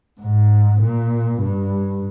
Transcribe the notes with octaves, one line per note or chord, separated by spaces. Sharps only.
G#2
A#2
G2